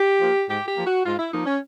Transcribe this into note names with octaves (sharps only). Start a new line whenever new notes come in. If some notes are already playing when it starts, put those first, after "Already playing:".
Already playing: G4
F3 A#3
G#2 G4
G4
F3 A#3
F#4
G#2 F4
E4
F3 A#3 D#4
C#4